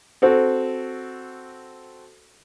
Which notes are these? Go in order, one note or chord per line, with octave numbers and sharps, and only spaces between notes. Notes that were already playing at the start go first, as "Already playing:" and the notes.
C4 F#4 A4